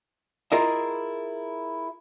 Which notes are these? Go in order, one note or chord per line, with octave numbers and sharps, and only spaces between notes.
E4 F4 G#4 A#4 D#5 E5